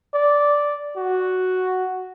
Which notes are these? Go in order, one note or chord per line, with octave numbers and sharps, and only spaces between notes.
D5
F#4